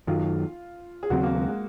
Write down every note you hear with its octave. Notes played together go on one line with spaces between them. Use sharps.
F#2 D#3 F#3 F4
G#4
D#2 C#3 F#3 C4 F#4
A#3
G#3
G#3